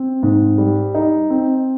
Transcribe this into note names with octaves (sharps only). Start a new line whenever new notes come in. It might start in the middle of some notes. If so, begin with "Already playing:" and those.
Already playing: C4
G#2
G3
D#4
C4